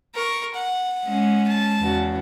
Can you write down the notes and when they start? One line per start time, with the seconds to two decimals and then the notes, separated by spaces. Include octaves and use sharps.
0.14 A#4 C#6
0.55 F#5
1.06 G#3 C#4
1.47 A5
1.79 E2 C#3 F#4